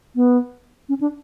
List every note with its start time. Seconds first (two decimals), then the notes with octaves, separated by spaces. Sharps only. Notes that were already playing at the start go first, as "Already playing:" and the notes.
0.16 B3
0.89 C#4
1.01 D4